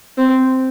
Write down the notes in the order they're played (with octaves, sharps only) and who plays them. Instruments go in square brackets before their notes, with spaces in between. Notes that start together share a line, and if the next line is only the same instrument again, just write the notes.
[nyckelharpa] C4